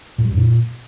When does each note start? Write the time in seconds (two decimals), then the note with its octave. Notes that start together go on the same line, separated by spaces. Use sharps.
0.18 A2
0.25 G3
0.31 F#2
0.37 A#2